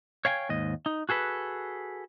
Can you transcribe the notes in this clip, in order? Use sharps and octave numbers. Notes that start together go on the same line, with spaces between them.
C#5 F5 G5 G#5
D#2 G#2 D#5
D#4
F#4 G#4 A4 B4